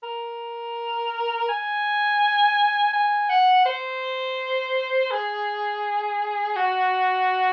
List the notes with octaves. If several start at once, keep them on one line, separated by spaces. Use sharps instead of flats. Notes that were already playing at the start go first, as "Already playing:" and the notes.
A#4
G#5
G#5
F#5
C5
G#4
F#4